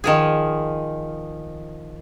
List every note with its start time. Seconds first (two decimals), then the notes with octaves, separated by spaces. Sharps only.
0.04 D#3 F3 G#4